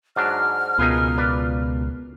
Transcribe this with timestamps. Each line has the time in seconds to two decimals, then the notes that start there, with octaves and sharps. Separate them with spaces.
0.16 G#2 F#3 D4 F6
0.79 C#2 B2 D#4 F4 G#4 A#4 B4
1.18 B4 D5